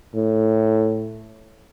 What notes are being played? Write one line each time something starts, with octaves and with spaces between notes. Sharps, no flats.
A2